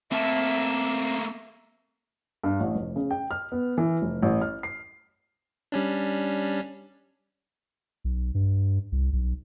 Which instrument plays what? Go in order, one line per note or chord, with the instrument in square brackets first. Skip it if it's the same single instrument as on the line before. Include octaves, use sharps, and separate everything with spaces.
[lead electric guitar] A3 A#3 [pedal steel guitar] C4 A5 [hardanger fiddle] E5
[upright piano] G2
A1
F1
C#3
G5
F6
B3
E3
F1
A1
F6
C7
[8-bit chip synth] G3 C#4 D4
[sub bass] B1
G2
C2
B1